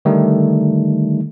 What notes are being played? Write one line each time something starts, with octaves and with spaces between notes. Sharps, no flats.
D3 D#3 G3 A3 D#4